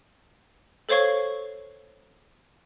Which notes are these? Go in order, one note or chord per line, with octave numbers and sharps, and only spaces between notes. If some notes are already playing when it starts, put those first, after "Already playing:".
A4 C5 C#5 F5 C#6 G#6